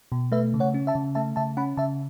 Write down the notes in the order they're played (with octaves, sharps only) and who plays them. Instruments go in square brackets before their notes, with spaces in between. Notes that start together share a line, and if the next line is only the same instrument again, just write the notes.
[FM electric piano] B2
A3 B4 E5
C#3
C#5 F#5
C#4
E5 A5
C#3
A3 E5 A5
C#3 E5 A5
C#4 F#5 B5
C#3 E5 A5